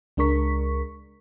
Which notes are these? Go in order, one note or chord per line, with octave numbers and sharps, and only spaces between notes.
C#2 G#3 D4 A#4 C#6 B6